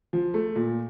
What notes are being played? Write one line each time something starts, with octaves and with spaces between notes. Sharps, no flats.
F3
A3
A#2